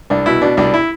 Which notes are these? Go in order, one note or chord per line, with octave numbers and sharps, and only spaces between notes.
C2 D4
B2 E4
B2 D4
C2 D4
E4